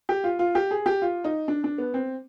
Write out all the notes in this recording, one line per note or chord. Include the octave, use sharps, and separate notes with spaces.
G4
F4
F4
G4
G#4
G4
F4
D#4
D4
D4
B3
C4